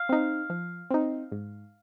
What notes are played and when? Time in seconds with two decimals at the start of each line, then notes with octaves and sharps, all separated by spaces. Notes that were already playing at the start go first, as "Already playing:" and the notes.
Already playing: F5
0.09 C4 D#4
0.50 F3
0.91 C4 D#4
1.32 G#2